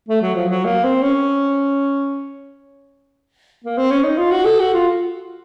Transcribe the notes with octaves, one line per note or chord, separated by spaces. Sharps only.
A3
F#3
F3
F#3
A#3
C4
C#4
A#3
C4
C#4
D#4
F4
F#4
A4
F#4
F4